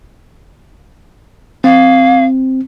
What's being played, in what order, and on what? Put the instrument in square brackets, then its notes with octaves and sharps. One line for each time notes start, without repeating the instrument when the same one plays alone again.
[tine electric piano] C4 [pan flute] F5